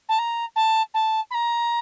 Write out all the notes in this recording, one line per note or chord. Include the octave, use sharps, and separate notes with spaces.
A5
A#5
A5
A5
B5
A#5